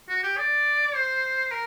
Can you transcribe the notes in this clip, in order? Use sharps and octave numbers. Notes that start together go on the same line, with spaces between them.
F#4
G4
D5
C5
A#4